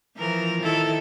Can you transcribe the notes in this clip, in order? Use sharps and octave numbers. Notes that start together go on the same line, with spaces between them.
E3 F3 A#4
D#3 E4 A4